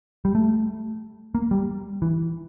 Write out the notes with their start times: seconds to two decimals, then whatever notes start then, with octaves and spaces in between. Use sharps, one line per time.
0.25 G3
0.35 A3
1.35 A#3
1.51 G3
2.02 E3